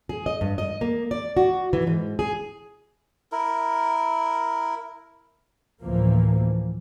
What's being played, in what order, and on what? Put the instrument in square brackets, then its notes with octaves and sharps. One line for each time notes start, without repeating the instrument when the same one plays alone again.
[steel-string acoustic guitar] G#4
D#5
G2
D#5
A#3
D5
F#4
E3
G#2
G#4
[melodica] E4 A#4
[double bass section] D2 A2 E3 F3 A#3